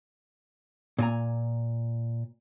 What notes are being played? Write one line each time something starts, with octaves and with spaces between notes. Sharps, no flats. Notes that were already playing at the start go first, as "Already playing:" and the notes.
A#2 G#5 A#5